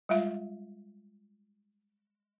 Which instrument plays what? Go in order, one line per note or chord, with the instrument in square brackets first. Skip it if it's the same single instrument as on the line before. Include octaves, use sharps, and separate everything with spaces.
[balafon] G3 G#3 F4 E5 F5